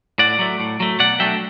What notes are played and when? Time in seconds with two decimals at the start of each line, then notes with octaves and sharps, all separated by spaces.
0.18 A2 D5 F#5
0.39 F#3 A3
0.60 A2
0.80 F#3 A3
0.99 B2 D5 F#5
1.19 F#3 A3 D4 E5 G5